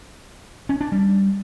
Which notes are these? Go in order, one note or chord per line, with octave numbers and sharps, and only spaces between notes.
C#4
D4
G3